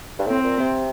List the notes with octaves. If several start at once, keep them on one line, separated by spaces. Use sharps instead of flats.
G2
A2 C4
A#2
C3